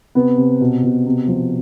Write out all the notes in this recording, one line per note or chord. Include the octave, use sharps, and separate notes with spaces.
C3 B3
C3
B2
B2
C3
F3